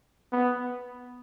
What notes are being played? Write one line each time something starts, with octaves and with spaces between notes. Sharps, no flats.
B3